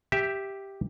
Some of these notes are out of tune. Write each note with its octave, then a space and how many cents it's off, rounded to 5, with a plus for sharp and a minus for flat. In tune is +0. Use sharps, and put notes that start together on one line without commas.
G4 +0 E5 +0